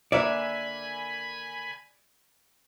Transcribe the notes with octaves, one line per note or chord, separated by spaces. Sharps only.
D3 A#3 D5 E5 G#5 B5